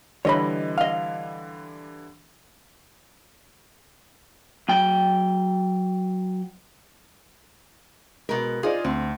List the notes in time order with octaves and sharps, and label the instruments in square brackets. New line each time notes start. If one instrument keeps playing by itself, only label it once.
[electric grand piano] D3 E3 G3 [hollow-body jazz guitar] C#5 D#5 B5
[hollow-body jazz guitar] D#5 F5
[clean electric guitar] F#3 G5
[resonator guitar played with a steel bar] B2 A#4 [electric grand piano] G#3
[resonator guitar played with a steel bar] D#4 G#4 [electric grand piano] F4 C5 D5
[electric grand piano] D2 [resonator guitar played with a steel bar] C4